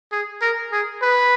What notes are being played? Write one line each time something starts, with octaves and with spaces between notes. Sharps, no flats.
G#4
A#4
G#4
B4